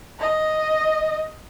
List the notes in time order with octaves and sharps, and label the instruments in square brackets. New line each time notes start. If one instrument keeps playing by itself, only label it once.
[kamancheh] D#5